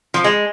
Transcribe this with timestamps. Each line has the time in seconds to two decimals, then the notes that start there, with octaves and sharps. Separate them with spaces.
0.14 F3
0.24 G#3